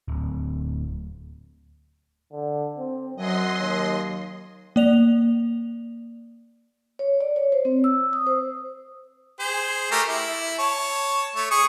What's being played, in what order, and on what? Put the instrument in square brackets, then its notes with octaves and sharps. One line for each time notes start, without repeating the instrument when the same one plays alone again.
[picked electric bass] D1
[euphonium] D3
C4
[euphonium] F#2 [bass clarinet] F#3 [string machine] D#5 C6
[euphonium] D#2
[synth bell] A#3 D5 F7
[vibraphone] C#5
D5
C#5
C5
C4
E6
D#6
C5
[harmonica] G#4 C5
A3 G4 A#4
E4
C#5 A5
A3 C#5
G#4 C#6 D#6